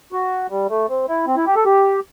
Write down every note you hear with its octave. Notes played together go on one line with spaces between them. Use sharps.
F#4
G3
A3
C4
E4
C4
E4
G4
A4
G4